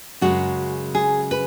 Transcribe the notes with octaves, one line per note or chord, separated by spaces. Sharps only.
F#2 C#3 G#3 F#4
G#4
B4